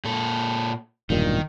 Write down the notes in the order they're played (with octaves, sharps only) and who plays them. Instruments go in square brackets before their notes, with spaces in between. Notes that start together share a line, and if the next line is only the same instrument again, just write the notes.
[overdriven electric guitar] A#2 A4
[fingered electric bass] E1 G2 A#2 [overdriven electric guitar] D#3